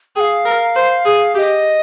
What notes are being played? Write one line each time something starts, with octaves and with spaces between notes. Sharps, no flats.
G#4 G5
F5
A#4
C5
G#4
G4 D#5 F5